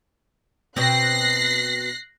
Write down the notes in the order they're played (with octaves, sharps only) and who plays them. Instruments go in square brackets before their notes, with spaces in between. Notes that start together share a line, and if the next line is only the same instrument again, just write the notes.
[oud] B2 C4 [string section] F#6 A#6 C7